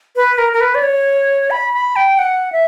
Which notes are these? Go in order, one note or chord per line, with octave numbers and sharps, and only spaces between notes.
B4
A#4
A#4
B4
D5
C#5
B5
B5
G5
F#5
E5